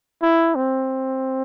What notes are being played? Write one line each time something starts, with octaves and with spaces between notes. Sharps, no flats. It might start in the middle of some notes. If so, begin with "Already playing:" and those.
E4
C4